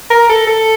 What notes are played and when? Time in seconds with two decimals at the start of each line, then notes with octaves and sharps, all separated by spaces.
0.10 A#4
0.30 A4
0.47 A4